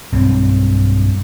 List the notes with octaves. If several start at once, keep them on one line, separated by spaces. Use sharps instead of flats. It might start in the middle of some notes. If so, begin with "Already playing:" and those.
B1 G2 C4